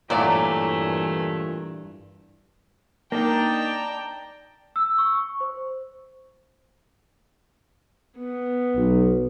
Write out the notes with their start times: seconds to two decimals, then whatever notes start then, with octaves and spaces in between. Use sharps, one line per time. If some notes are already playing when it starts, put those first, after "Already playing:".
0.10 G2 A#2 E3 F#3 A3 E4 D5
3.12 A#3 D4 D#4 D5 G5 A5 A#5
4.76 E6
4.98 C#6
5.41 C5
8.17 B3
8.76 B1